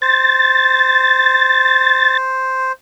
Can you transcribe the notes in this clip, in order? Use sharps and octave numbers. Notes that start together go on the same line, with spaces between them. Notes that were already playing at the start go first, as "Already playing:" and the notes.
C5 A6